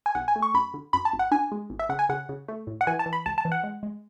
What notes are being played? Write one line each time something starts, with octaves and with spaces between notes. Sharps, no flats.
G#5
B1 F#5
G#5
A3
C#6
F#2 B5
D3
F#2 B5
A5
G#1
F#5
D4 G#5
G#3
G#1
E5
C#3 F#5
G#5
C#3 F#5
C#3
A3
A2
F#5
E3 G#5
A5
E3
B5
C#2 A5
A5
E3
F#5
G#3
G#3